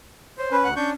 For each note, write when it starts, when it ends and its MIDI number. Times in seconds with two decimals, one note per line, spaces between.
0.38 0.56 72
0.38 0.48 73
0.51 0.68 61
0.51 0.68 71
0.51 0.70 83
0.64 0.74 38
0.64 0.74 78
0.64 0.74 90
0.76 0.93 61
0.76 0.93 62
0.76 0.90 85
0.76 0.90 91